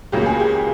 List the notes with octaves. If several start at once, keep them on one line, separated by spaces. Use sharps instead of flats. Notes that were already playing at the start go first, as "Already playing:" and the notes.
C#2 C#3 F#3 A#3 G4
G#4
G4